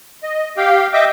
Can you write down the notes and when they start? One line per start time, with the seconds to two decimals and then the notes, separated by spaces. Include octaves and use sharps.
0.23 D#5
0.57 G4 F5 G5
0.93 D#5 E5 G5 D6